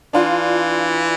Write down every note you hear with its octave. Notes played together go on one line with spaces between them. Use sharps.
E3 D4 F4